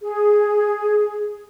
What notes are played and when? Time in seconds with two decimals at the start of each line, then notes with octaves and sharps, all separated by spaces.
0.02 G#4